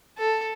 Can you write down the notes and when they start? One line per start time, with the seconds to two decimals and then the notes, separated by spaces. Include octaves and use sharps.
0.18 A4